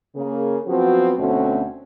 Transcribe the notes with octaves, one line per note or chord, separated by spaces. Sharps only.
C#3 A#3 G#4
F3 F#3 B3 C4 F#4
D2 B2 A3 C4 C#4 F#4